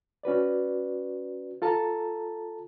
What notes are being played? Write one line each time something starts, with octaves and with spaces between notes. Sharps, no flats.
C#4 F#4 B4 D5
F4 A4 A5 A#5